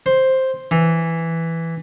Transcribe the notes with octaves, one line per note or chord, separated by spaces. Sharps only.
C5
E3